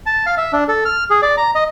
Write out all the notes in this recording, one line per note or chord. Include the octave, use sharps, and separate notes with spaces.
A5
F5
E5
D4
A4
F6
G#4
D5
A#5
D#5